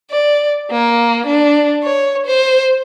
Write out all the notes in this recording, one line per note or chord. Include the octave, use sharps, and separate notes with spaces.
D5
A#3
D4
C#5
C5